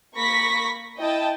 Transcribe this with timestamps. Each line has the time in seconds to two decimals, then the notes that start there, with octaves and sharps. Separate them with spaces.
0.15 A#3 B5 C#6 A#6 B6
0.98 E4 D#5 G5 A5